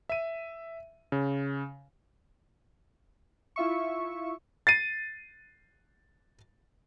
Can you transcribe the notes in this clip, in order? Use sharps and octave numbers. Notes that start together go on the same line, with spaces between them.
E5 D#7
C#3
E4 F4 E5 C#6
A6 C7 D#7